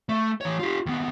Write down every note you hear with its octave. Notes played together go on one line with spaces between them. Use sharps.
A3
E3 C#5
F4 G4
D#2 B3